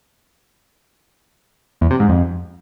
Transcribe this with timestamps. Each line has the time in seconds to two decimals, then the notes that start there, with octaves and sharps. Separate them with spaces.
1.81 E2
1.90 C3
2.00 G#2
2.09 F2